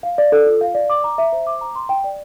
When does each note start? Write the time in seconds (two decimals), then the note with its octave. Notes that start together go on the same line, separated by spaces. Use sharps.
0.03 F5
0.18 D5
0.32 A4
0.46 F4
0.61 F5
0.75 D5
0.90 D6
1.04 A#5
1.18 E5
1.33 C5
1.47 D6
1.61 A#5
1.75 C6
1.89 G5
2.04 D5